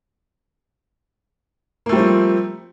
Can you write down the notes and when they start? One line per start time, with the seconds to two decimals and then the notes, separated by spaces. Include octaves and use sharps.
1.86 A#3
1.89 A3
1.92 G3
1.95 C4
1.99 F3